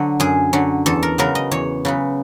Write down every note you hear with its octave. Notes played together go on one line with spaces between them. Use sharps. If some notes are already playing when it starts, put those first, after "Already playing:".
Already playing: D3 F#3
F#2 G#4
D3 F#3
E2 A4
A#4
C#3 F#3 B3 A#4
D#5
E2 C#5
C#3 F#3 B3